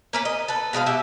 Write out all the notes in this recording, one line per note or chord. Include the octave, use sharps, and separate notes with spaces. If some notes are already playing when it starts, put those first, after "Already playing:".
A#3 C#4 B4
D#5
A4 B4
B2 G#3 A#4 F5
B2 G4 E5